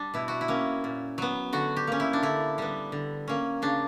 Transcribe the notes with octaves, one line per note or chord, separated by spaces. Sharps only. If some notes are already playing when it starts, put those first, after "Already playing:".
Already playing: G3 D4
B2 E4
F#4
E4
A#3 C#4
A#2
F#3 B3
D3 F#4
G4
A#3 C#4
E4
D4
D3 E4
G3 B3
D3
A#3 C#4
C#3 D4